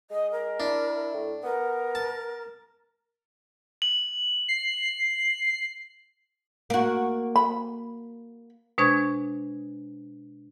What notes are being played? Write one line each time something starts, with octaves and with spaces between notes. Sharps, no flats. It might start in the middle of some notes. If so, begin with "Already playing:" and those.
G#3 D#5
A#4
D4 E4
A2
B3 A#4
A5
F#7
C7
A#3 F#4
B5
B2 G#3 D4 C5 C#6 G#6